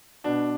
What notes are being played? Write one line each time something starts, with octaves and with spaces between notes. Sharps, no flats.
B2 D4